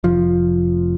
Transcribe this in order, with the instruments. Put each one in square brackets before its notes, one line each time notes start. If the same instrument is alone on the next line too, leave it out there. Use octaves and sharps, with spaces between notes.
[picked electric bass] F1 F3